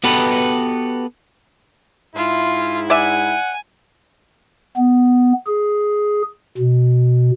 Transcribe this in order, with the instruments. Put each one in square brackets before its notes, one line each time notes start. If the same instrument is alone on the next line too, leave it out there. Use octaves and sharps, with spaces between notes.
[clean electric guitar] B3 F#4 G4 A4 B4
[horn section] G#2 E4 [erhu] F4
[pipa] D5 E5 [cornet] F#5 [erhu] G#5
[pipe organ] B3
G#4
B2